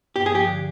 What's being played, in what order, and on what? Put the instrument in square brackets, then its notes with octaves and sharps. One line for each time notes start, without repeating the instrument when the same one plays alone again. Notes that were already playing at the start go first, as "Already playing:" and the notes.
[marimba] G2 [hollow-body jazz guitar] G4
[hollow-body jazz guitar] G#4
[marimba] F3 [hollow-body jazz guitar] G4
[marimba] D3